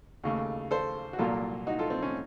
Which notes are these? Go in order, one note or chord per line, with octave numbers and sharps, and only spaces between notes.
D#2 C#3 A3
A4 C5
F#4
C2 A#2 F#3 A#3 F4 A4
D#4 F#4
F4 A4
C4
C#4